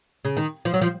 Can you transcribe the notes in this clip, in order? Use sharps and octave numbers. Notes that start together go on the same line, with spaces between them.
C#3
D#3
F3
F#3
F3